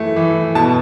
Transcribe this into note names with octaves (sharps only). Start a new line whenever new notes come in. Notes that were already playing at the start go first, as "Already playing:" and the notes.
Already playing: E3 A3
E3
B2 A5